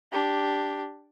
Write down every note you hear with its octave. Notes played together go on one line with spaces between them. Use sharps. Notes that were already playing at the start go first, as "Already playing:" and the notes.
D4 G4